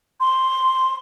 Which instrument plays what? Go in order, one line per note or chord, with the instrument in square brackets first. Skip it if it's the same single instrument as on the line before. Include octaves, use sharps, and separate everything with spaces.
[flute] C6